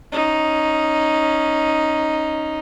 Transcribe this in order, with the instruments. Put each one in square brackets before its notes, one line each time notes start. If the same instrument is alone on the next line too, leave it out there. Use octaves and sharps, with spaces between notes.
[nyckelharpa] C#4 D#4